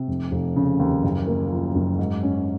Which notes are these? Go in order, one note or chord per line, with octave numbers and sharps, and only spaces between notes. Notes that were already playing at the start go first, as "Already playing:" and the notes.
Already playing: C3
F1
F1
C#3
D#2
F#1
A#3
F3
F#2
G#2
C#4